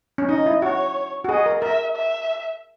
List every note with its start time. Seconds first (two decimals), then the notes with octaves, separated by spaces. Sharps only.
0.18 C#4
0.29 D#4 D#5
0.46 E4
0.62 F#4 C#5
1.24 F#4
1.29 G#4 D#5
1.46 A#4
1.62 A#4 E5
1.96 E5